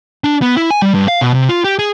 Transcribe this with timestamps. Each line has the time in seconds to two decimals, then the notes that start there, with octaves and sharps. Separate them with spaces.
0.24 D4
0.42 B3
0.57 E4
0.71 G#5
0.82 G3
0.95 G2
1.08 F5
1.21 B2
1.34 C3
1.49 F4
1.64 G4
1.79 G#4